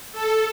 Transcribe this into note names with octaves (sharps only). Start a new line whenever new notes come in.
A4